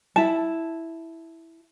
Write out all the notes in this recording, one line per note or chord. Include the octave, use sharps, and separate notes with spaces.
E4 A5